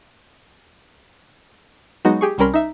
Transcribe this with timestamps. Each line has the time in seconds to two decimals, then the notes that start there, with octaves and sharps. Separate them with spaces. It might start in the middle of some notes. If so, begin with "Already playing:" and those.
2.05 F#3 G#3 B3 D#4 F#4
2.21 G4 G#4 C#6
2.38 C2 G3 C#4 A#4 B5 C6
2.54 D#4 E5